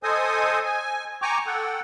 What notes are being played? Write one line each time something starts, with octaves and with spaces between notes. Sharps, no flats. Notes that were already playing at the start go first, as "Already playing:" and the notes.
A4 C5 D#5 G#5 D#6
G#5
G5 G#5 A#5 C#6 D6
A4 F#5 G5